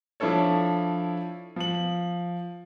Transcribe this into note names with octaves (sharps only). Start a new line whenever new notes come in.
F3 D4 E4 A4 C#5
F3 F#7